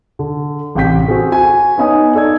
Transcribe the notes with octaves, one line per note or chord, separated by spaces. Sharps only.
D3
A1 C3 G5 G6 B6
C4 F#4 G#4 A4
F#4 G#5
B3 C#4 D#4 G#5 D#6
D#4 A4 D5 G#6